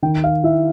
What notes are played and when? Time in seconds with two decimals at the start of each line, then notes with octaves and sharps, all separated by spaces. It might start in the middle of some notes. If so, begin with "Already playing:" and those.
0.02 D#3 G5
0.24 F5
0.44 E4 E5